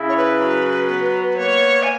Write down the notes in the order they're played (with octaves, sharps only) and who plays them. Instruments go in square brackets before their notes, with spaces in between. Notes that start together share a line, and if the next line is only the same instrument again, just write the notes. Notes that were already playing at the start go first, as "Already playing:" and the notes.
Already playing: [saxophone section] C#3 E4
[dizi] C#5
B4
[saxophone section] F#3
B3
[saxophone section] A#3 [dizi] C#5
[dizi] G#5